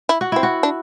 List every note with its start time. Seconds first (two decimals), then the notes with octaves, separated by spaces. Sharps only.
0.09 E4
0.21 F#4
0.32 C4 E4
0.43 F#4
0.63 D4